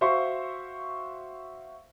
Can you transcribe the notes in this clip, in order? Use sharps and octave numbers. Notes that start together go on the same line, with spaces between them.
F#4 C5 E5 F5 C6 C#6